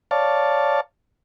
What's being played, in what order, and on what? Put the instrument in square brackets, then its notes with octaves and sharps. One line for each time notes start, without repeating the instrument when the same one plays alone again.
[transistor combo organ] C#5 D5 F5 A5